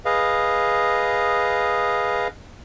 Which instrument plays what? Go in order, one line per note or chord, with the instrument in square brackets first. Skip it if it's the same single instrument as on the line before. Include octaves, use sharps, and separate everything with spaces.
[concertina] G#4 B4 D#5 F5